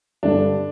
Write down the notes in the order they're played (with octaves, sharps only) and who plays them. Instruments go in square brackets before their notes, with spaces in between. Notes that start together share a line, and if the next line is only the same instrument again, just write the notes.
[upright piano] G2 D3 G3 [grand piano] D4